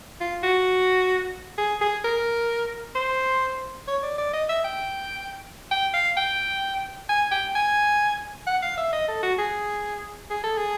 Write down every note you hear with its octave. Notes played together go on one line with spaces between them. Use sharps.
F4
F#4
G#4
G#4
A#4
C5
C#5
D5
D5
D#5
E5
G5
G5
F5
G5
G#5
G5
G#5
F#5
F5
E5
D#5
A4
F#4
G#4
G#4
A4
G#4